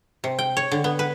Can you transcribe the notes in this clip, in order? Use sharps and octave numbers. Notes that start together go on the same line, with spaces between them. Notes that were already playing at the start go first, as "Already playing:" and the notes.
C3
G5
C#5
D3
B3
B4